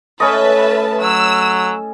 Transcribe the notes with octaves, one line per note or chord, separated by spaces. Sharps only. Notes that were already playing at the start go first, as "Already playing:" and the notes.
A2 C#4 A4 B4 D#5 E5 A5 C#6
F#3 E6